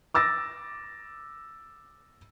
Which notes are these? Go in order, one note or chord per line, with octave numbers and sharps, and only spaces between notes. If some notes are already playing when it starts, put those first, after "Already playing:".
D6 E6 A6 A#6